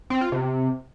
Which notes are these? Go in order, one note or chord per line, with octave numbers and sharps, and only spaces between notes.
C4
F4
C3